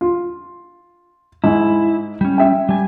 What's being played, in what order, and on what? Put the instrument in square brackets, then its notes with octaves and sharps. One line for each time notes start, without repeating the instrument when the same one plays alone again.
[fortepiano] F4
[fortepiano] G#2 [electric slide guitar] E4
[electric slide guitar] G3 C#4
[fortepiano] E5 G5
[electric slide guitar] G3 G#5